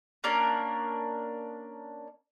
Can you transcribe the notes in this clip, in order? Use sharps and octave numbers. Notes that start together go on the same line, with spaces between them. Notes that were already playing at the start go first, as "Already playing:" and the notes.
A#3 C#4 D4 A#4